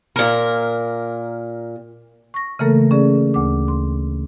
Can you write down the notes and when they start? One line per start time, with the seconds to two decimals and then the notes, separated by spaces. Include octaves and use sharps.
0.16 A#2 A#4
2.34 C#6 A#6
2.59 C#3 E3 A3 A#3 A4 A#4
2.91 C#4 G#4 D5
3.34 D2 D6
3.68 C6